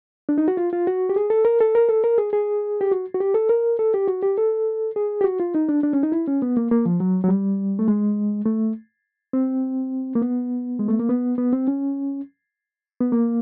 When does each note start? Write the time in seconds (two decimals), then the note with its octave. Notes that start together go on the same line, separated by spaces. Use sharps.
0.29 D4
0.38 D#4
0.48 F#4
0.57 F4
0.73 F4
0.87 F#4
1.09 G4
1.16 G#4
1.30 A4
1.45 A#4
1.60 A4
1.75 A#4
1.89 A4
2.04 A#4
2.18 G#4
2.33 G#4
2.81 G4
2.91 F#4
3.14 F#4
3.20 G4
3.34 A4
3.49 A#4
3.79 A4
3.94 G4
4.07 F#4
4.23 G4
4.38 A4
4.96 G#4
5.21 G4
5.24 F#4
5.40 F4
5.55 D#4
5.69 D4
5.83 D4
5.93 C#4
6.03 D#4
6.12 E4
6.28 C#4
6.42 B3
6.57 A#3
6.71 A#3
6.86 F3
7.00 F#3
7.24 F#3
7.28 G3
7.79 A3
7.88 G#3
8.46 A3
9.33 C4
10.15 A#3
10.22 B3
10.79 G#3
10.88 A3
10.99 A#3
11.09 B3
11.38 B3
11.53 C4
11.68 C#4
13.01 B3
13.12 A#3